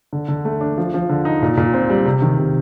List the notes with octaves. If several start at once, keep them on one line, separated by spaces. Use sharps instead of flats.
D3
D3
A3
D4
F3
F3
D3
D#4
A#2
A#2
C4
G3
C3
D#3
C3